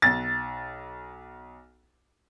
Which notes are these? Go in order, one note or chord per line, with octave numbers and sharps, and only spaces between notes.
B1 A6